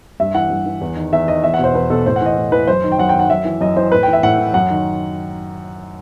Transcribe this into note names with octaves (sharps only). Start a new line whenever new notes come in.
G2 E5
E3 F#5
G2
E3
E2
D#3
E2 E5
D#3 D#5
E2 E5
F#5
B2 C5
E2 B4
B2 A4
A2 C5
F#5
E3 D#5
A2
E3 B4
F#2 C5
D#3
G5
F#2 F#5
G5
D#3 F#5
F#2 E5
E3
F#2 D#5
E3 C5
A2 B4
G5
E3
E5
A2 F#5
E3
F#2 F#5
D#3